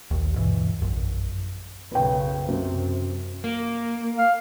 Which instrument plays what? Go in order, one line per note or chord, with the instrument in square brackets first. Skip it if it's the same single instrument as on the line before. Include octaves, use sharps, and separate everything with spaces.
[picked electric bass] A#1 D#2
D2 G2 B2 E3
A#1 F#2
[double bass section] B1 F#2 C#3 [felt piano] B4 G5
[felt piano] F#2 [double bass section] C3
[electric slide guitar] A#3
[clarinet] F5